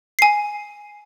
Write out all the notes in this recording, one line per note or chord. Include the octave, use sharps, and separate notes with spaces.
G#5 C7